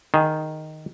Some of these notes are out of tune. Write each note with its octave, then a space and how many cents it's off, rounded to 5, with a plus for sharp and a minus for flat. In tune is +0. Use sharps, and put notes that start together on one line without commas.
D#3 +0 G#4 +5